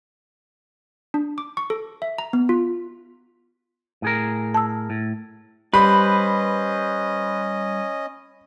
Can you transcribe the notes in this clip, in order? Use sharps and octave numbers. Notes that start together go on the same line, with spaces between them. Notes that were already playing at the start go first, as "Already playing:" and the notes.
D4
D6
C#6
A4
E5
A#5
B3
F4
A2 G#4 A#4
A5 E6
A2
G3 C#4 B4 C5 D#5 B5